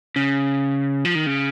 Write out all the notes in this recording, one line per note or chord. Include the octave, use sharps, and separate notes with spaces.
C#3
F3
D#3
C#3